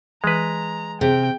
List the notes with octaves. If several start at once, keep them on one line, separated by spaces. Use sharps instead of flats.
E3 G#3 B4 A#5
C3 G#4 G5